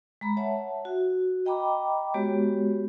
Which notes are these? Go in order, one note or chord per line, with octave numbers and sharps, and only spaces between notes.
G#3 A#5 B5
C#5 E5 F#5 A5
F#4
D#5 G5 A#5 B5 D6
G#3 B3 F#4 G4 C#5